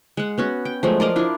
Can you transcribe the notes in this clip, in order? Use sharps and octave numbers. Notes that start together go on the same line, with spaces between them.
G#3 F#5
B3 C#4 F#4
G5
F3 F#3 G#3 A3
A#4 D5 D#5 F5
D4 E4 F4